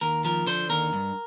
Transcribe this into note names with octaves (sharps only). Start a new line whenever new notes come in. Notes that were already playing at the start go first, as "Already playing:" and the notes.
D#2 A#4
F3 A#4
D3 C5
D#2 A#4
G2